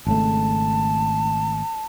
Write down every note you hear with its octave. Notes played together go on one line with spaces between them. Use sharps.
G#1 C#3 A3 A5